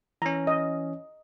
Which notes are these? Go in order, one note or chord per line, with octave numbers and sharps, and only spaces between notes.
E3 C#4 A#5
D#5